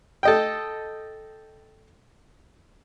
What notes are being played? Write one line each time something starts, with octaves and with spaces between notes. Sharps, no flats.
A4 D#5 G5